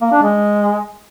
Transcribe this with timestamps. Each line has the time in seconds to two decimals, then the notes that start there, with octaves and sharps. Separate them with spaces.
0.01 A#3
0.12 D4
0.23 G#3